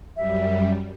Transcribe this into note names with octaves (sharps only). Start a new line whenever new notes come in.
F#2 G3 E5